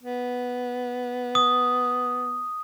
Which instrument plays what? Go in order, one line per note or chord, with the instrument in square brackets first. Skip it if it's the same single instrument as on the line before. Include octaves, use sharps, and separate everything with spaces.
[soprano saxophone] B3
[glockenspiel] D#6